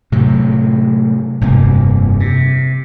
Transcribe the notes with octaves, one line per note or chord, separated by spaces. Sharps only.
A2 C3 F#3
F1 G2 C3 A#3
C3